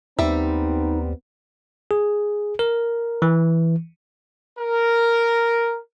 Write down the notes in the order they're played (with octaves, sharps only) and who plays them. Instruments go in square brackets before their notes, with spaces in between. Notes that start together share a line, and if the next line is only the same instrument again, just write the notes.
[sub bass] D#2 [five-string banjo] G3 E5 [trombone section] B3 C4 [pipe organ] D#4
[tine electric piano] G#4
A#4
E3
[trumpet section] A#4